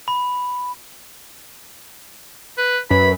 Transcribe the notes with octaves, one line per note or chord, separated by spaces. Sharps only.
B5
B4
F#2 B4 B5